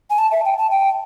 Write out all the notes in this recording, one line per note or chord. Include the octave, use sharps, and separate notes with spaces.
G#5
A5
E5
G5
A5
G5